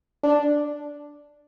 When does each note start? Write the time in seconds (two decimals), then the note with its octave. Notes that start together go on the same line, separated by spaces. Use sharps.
0.24 D4